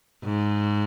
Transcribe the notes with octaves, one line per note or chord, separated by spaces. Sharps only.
G#2